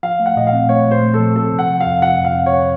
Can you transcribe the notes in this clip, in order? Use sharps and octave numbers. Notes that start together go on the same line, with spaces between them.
F3 F5
A3
F#5
A#2 D#5
F5
C4
A3 C#5
A#2
C5
A3
A4
F3
C4 A4
C3
F#5
F3
F5
F2
C3 F#5
F2
F5
C4
C#5